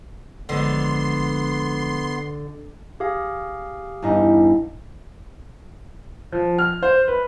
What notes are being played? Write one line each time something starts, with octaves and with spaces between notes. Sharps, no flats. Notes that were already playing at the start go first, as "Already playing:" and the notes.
G#1 D3 F3 G#3 B3 C6
G4 G#4 F5
E2 G2 D#4
F3
F6
C5
B4